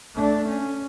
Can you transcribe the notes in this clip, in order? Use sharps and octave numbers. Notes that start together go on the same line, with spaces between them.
A3 D4
C#4